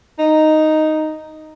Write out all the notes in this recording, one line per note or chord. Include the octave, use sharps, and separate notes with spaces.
D#4